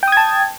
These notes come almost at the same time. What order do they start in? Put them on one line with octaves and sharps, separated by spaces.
G5 D#6 G#6 A5